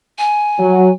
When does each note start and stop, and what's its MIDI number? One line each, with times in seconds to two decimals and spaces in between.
0.19 0.93 80
0.59 0.89 54